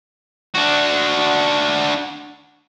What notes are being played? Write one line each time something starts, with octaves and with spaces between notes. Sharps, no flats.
D4 F#4